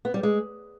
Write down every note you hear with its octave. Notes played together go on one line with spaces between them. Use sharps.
B3
G3
G#3